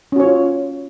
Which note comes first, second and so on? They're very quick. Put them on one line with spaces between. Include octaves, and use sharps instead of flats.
C#4 F#4 C#5 F4